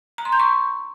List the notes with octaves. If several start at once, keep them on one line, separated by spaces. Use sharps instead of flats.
A#5
C6
G6
C#6